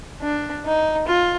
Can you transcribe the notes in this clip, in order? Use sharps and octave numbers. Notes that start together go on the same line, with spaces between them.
D4
D#4
F4